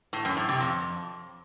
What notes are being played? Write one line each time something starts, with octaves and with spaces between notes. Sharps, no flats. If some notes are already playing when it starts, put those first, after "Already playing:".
A2
F#2
A2
C3
F2